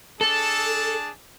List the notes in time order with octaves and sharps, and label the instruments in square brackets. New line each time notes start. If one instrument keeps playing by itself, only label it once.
[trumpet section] D4 G#4 A5 [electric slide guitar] A4